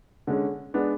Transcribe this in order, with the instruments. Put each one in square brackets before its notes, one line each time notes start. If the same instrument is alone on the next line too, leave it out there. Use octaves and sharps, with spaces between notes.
[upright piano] D3 G#3 C#4
G#3 B3 D4